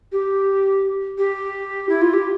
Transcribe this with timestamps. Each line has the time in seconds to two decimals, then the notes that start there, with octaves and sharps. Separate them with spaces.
0.12 G4
1.18 G4
1.89 E4
2.01 F4
2.13 G4